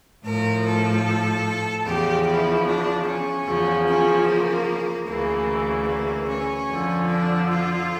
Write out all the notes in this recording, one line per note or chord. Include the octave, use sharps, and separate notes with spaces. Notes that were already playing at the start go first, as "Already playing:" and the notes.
A2 F3 A#4
A4
E2 C#3 F3 G4
E4
D4
C#4
E2 C#3 F3
C#4
A#3
D2 C#3 E3 A#3
A#3
C#4
F2 D3 F3
D4
F4